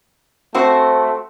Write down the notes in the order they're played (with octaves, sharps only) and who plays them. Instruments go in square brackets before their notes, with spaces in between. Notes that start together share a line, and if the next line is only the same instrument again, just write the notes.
[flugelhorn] A3 [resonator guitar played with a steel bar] C4 F#4 C5